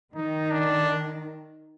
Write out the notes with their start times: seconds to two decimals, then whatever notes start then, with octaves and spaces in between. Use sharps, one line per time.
0.15 D#3 D#4
0.51 D4